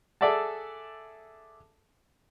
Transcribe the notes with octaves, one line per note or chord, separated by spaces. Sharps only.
G#4 A4 D5 E5 F#5 A5